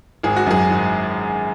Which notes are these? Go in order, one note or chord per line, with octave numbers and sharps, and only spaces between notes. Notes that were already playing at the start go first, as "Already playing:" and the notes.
G#1 G#4
F#4
F#2 G#4
G#1